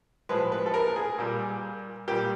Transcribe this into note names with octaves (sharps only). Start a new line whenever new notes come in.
A2 F3 G#3 B4
B4
A4
A#4
G#4
A#2 G3
A#2 G3 G4